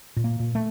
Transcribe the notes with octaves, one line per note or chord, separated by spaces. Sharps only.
A#2
A#3
A#2
A3